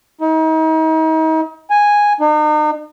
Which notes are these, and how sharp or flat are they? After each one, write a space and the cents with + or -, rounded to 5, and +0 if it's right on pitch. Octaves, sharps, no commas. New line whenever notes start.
D#4 +40
G#5 -5
D#4 -40